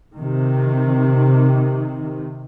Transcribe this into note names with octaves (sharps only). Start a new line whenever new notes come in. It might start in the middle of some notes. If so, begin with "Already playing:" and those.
C3 D#3